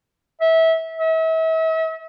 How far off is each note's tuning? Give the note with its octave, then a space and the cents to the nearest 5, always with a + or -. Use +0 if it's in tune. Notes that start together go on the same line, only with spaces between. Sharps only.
E5 -20
E5 -40